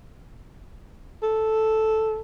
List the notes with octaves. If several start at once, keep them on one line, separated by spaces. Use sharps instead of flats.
A4